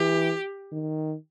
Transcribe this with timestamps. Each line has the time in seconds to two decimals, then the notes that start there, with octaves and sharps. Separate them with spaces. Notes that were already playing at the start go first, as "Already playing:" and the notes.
Already playing: E3 G4
0.72 D#3